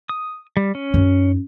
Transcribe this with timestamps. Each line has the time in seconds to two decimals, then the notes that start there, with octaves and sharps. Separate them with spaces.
0.09 D#6
0.57 G3
0.75 C#4
0.94 F#2 D#4